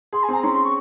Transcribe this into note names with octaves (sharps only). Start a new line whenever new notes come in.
G#4 C6
G#5
C4 A#5
C#4 C6
C6
C#6